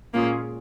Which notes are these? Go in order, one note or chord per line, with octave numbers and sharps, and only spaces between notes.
A#2 G#3 A#3 C#4 F4 G#4